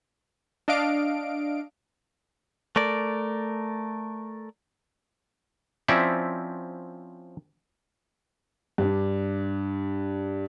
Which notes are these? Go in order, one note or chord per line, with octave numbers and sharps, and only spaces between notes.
D4 D#5 F5 D7
A3 A#4 D5
F3 C4 C#4 E4 D5 E5
G2 D4